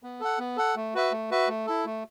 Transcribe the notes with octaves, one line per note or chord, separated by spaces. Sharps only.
B3
A4 F#5
B3
A4 F#5
A3
F#4 B4 E5
A3
F#4 B4 E5
A3
E4 A4
A3